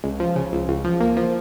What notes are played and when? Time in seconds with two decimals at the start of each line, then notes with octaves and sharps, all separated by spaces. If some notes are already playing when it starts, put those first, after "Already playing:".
0.04 C#2
0.20 F3
0.36 C#3
0.52 C#2
0.68 C#2
0.84 F3
1.00 A#3
1.17 F3